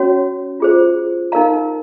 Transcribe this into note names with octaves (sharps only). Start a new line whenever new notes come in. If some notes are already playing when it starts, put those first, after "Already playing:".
Already playing: C#4 F#4 C#5
F4 G#4 C5
D#4 A#4 F5 A#5